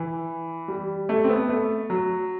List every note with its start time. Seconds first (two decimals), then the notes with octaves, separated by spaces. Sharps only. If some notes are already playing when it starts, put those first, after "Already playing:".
Already playing: E3
0.68 G3
1.09 A3
1.24 C4
1.29 B3
1.49 A3
1.90 F#3